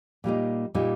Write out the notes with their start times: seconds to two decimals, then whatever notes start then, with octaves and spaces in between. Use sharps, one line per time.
0.24 A#2 G3 A#3 D#4
0.74 A#2 G3 A#3 D#4